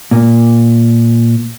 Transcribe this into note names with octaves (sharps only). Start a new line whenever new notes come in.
A#2